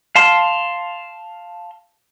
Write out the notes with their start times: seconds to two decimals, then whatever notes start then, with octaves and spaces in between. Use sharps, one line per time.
0.16 F5 A5 C6